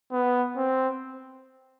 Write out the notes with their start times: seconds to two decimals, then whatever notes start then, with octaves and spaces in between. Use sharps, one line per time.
0.12 B3
0.57 C4